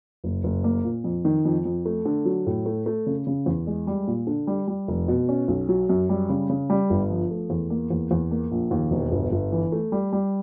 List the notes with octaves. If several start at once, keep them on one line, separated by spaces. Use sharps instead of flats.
F#1
F#1
A#3
A#2
F2
D#3
F2
F2
A3
D3
F#3
A2
A3
A3
C#3
C#3
E2
G#3
G3
A#2
D3
G3
G3
F1
B2
C#4
B1
F#3
F#2
G3
C#3
C#3
G3
G1
F3
A3
E2
A#3
E2
E2
A#3
A#1
D#2
E1
G1
G1
E3
A3
G3
G3